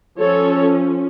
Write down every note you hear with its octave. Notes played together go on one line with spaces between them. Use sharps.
F3 C#4 A4 C#5